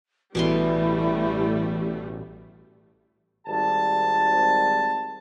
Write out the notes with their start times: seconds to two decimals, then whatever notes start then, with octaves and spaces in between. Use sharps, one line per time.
0.35 A1 B2 E3 G3 A3 G#5 C6
3.48 G#1 G3 A5